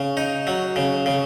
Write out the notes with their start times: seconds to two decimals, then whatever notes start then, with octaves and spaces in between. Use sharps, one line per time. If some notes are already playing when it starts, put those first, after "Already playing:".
Already playing: C#3
0.17 D#4
0.47 F#3
0.76 C#3
1.06 C#3